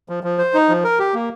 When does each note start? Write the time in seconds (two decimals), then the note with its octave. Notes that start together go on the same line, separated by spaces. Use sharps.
0.09 F3
0.24 F3
0.38 C5
0.54 D#4
0.69 F3
0.84 A#4
0.99 G4
1.14 A#3